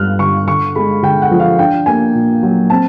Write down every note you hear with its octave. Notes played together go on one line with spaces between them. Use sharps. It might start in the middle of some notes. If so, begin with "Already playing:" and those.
Already playing: G2 G3 B3 F6 F#6
D3 C#6
D3 C#6
G#3 B5
D3 G5
F#5
F3
F5
D4 G5
A#3 G#5
A#2
F#3
C4 A5